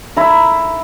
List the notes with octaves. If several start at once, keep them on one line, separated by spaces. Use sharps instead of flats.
E4 A#5